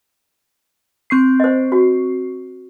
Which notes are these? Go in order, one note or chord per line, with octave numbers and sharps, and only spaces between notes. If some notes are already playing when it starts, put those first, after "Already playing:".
C4 C#6 C7
C5 D#5
F#4